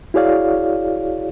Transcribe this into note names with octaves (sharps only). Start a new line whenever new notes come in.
E4 F#4 G#4 C#5 D5 F5